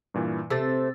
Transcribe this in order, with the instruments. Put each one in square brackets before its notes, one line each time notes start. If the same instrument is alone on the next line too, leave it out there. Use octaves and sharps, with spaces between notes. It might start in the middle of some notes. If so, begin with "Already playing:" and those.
[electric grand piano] G2 A#2 E3
[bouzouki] C3 A3 C4 [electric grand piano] E6 A6